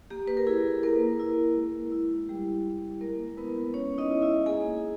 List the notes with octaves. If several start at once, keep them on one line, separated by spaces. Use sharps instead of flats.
A#3 G4
B4
A#4
E4 G#4
A#3 A#4
E4
G#3
E4
G3 G4
E4
G#3 A#3 A#4
B3 E4 B4
G#3 C#4 C#5
D#4 D#5
E4
E4 E5
A#3 G#4 G#5